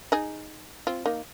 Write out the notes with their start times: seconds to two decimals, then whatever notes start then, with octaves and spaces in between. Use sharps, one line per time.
0.12 D#4 G#4
0.87 C4 F4
1.06 A#3 D#4